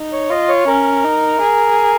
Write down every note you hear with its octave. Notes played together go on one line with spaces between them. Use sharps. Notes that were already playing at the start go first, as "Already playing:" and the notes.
Already playing: D#4
C#5
F4 D#5
C#5
C#4 A#4
D#4
G#4